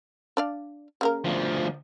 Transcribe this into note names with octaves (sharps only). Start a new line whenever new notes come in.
D4 D5 F5
C#3 A#3 A#4
D2 F3